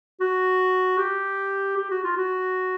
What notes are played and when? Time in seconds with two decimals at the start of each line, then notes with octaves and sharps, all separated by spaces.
0.21 F#4
0.98 G4
1.77 G4
1.91 F#4
2.04 F4
2.17 F#4